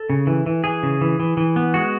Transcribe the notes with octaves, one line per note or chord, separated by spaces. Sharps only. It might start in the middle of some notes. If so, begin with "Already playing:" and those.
Already playing: A4
C#3
E3
E3
E3 G#4
C#3
E3
E3
E3
B3
G#3 F#4